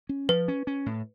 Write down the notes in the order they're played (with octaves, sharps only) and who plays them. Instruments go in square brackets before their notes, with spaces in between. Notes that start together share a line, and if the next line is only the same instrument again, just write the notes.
[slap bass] C#4
[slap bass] F3 [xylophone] B4
[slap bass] C#4
C#4
A2